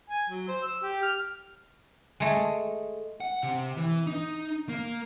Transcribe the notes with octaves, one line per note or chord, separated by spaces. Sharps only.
G#5
F#3
C5
E6
G4
F6
G#3 A3
F#5
C3
E3
D#4
A#3